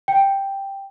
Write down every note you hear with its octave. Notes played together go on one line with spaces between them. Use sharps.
G5